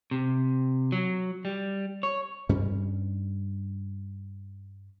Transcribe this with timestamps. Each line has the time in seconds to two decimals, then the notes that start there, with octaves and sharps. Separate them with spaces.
0.11 C3
0.92 F#3
1.45 G3
2.03 C#5
2.49 G2 G3 C#4